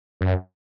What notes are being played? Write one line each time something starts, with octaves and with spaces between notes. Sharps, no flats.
F#2